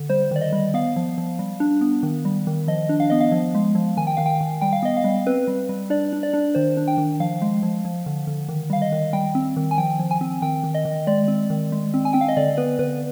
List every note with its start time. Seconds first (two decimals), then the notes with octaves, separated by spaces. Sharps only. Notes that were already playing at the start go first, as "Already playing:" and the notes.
Already playing: D3
0.09 G3 C5
0.31 D#3 D5
0.41 D#5
0.52 G3
0.74 B3 F5
0.96 F3
1.18 F3
1.39 G3
1.60 D4
1.81 B3
2.03 D#3
2.25 G3
2.47 D#3
2.68 F3 D#5
2.89 D4
3.00 F5
3.10 B3 D#5
3.20 F5
3.32 F3
3.55 G#3
3.75 F3
3.97 D#3 G#5
4.07 G5
4.17 D#3 F5
4.26 G5
4.41 D#3
4.61 G3 G5
4.73 F5
4.83 B3 D#5
4.97 F5
5.04 G3
5.26 C4 B4
5.48 G3
5.69 G3
5.90 D4 D5
6.13 D4
6.23 D5
6.33 D4
6.55 D#3 C5
6.77 D4
6.88 G5
6.98 D#3
7.20 F3 F5
7.42 G#3
7.63 F3
7.85 F3
8.06 D3
8.27 D3
8.49 D#3
8.70 G3 F5
8.82 D#5
8.92 D#3
9.13 G3 G5
9.35 C4
9.56 D#3
9.71 G#5
9.78 F3 G5
9.99 F3
10.11 G#5
10.21 C4
10.42 D#3 G5
10.64 D#3
10.74 D#5
10.85 D#3
11.07 G#3 D5
11.28 C4
11.50 D#3
11.72 G#3
11.94 C4
12.05 G#5
12.13 C4 G5
12.21 F5
12.28 D#5
12.37 D3 D5
12.57 B3 B4
12.79 D3 B4